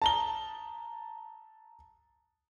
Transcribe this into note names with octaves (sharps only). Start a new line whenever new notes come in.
A5 A#5 G7